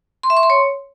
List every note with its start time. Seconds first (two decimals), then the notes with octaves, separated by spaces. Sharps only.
0.23 C6
0.30 E5
0.37 C#6
0.43 C6
0.50 C#5